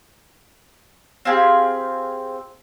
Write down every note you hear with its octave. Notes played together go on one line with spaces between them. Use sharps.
C4 F4 G4 G#4